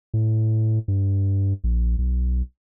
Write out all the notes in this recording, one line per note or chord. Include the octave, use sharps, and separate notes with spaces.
A2
G2
A#1
B1